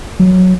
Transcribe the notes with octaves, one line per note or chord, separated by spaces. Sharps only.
F#3